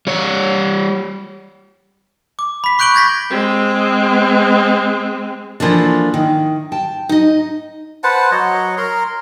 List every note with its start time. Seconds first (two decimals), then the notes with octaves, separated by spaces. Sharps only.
0.07 G3 C#5
2.39 D6
2.64 B5 B6
2.79 C#6 F#6 G6 D7 F#7 G7
2.95 G6 G#6 A#6 B6
3.30 G#3 C4
5.60 E3 F3 A3 A#3 D4
6.14 D#3
6.72 G5 A5
7.09 D#4 D#5
8.04 B4 C5 F#5 A5
8.31 F#3 C#5 D#5 F#5
8.78 A#4 A#5 C6